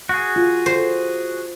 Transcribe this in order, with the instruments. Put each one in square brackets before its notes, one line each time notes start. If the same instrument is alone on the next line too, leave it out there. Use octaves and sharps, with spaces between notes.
[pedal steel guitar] F#4 G#4
[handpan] F4
[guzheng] C5